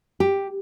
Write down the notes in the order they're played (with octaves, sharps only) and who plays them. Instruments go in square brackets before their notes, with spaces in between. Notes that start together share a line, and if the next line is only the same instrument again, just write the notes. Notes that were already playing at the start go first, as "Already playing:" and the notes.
[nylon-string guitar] G4